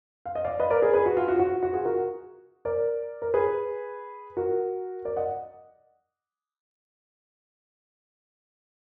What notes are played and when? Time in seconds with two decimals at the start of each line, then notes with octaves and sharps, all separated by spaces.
0.26 F5
0.35 D#5
0.45 D5 F5
0.60 B4 D#5
0.70 A#4 D5
0.82 G#4 B4
0.93 G#4 B4
1.06 F#4
1.17 F4
1.28 F#4
1.39 F#4
1.63 F#4
1.73 F4 G#4
1.85 F#4 A#4
2.65 A#4 D5
3.22 A#4
3.34 G#4 B4
4.37 F#4 A#4
5.05 A#4 D5
5.16 D#5 F#5